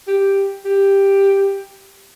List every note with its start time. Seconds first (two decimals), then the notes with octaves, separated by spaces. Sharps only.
0.07 G4
0.65 G4